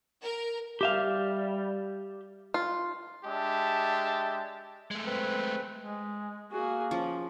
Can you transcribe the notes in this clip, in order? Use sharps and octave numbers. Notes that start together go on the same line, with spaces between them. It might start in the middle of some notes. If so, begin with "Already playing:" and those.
A#4
G3 G4 E5 F5
F4
G#3 D4 G4 E5 A5
G#3 A3
C4 B4
G#3
A#3 F#4 G#4
F3 C#4